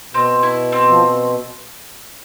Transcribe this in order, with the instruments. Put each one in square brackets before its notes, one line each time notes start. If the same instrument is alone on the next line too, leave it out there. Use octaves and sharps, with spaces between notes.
[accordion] B2 [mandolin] C4
[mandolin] E4
C4
[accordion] F3